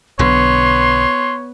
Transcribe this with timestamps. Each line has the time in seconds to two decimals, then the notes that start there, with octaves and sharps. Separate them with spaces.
0.19 B1 B2 D3 B3 C#5 C6